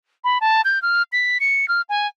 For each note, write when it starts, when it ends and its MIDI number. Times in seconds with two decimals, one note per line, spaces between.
0.24 0.38 83
0.41 0.61 81
0.65 0.81 91
0.82 1.02 89
1.12 1.38 95
1.40 1.68 97
1.68 1.82 89
1.89 2.07 80